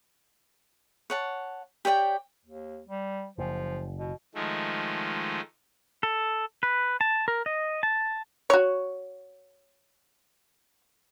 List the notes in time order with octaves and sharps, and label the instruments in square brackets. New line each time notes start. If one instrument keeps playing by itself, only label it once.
[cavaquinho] C#5 F#5 A5
G4 C#5 D5 G5
[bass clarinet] D#2
G3
[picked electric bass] F#1 [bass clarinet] F3
[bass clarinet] B2
[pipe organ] D#3 F3 G#3 A3
[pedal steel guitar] A4
B4
A5
A#4
D#5
A5
[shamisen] F#4 C#5